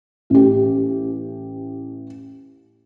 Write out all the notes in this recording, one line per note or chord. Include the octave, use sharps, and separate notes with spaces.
A1 G4